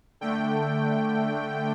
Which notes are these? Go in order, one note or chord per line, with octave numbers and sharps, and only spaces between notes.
D3 A3 G5